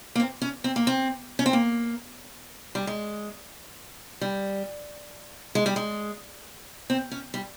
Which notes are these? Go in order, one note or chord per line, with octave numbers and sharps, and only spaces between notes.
A#3
C4
C#4
C4
A#3
C4
C#4
C4
A#3
G3
G#3
G3
G#3
G3
G#3
C4
C#4
G3